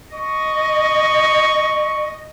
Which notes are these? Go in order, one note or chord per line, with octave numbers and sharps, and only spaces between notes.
D#5 C#6